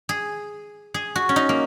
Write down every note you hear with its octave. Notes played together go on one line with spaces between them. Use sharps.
G#4
G#4
F#4
C#4
D#4
A#3